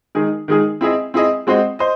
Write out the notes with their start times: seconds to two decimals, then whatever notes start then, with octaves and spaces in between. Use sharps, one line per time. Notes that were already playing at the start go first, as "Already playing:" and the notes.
0.15 D#3 G#3 D#4 G#4
0.48 D#3 G#3 D#4 G#4
0.81 C4 E4 G#4 D#5
1.14 C4 E4 G#4 D#5
1.47 G#3 C4 F#4 C5 D#5
1.79 C5 D#5